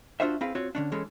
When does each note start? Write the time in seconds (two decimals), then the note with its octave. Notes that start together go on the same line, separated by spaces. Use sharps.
0.20 D4 D#4 F4 F#4 C5 E5
0.41 C4 E4 G#4 B4 F5
0.55 C4 F4 F#4 C#5
0.75 D3 C#4 D4
0.92 E3 G#3 C#4 A4